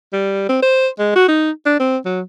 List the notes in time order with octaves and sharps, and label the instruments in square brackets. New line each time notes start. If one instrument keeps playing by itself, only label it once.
[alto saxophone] G3
C4
C5
G#3
F#4
D#4
D4
C4
F#3